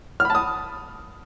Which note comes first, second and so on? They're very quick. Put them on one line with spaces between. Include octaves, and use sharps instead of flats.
F6 B5 A5 D#6